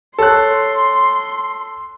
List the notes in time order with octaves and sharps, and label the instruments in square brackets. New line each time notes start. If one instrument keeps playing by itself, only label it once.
[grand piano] A4 C#5 F#6 [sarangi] C6